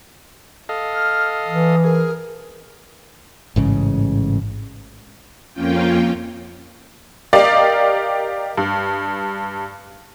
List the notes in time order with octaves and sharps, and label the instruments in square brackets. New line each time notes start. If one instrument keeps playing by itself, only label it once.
[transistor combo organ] A4 D#5 F5
[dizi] F6
[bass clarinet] E3 [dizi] D#6
[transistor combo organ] G#4 [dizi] A#4
[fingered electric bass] A1 G#2 C#3
[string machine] F2 A#3 C#4 F4 G5
[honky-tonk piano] G4 A#4 D5 D#5 F5
G2